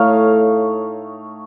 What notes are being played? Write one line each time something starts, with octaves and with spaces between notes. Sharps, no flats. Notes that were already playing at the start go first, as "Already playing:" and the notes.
Already playing: A2 A3 D#4 C#5 F5